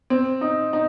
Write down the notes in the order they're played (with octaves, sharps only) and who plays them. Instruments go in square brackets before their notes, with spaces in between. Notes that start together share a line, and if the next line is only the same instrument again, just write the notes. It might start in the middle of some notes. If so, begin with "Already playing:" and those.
[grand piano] C4
D#4
D#4